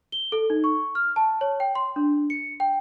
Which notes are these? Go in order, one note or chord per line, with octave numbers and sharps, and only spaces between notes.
G7
A4
D#4
C#6
F6
A5
C#5
G5
C6
D4
C#7
G5